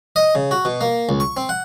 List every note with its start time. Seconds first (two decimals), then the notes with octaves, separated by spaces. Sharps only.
0.16 D#5
0.35 C#3
0.51 F#4
0.65 B2
0.81 A#3
1.09 C#2
1.20 C#6
1.37 C4
1.49 F#5